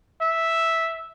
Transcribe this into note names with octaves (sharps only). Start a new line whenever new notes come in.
E5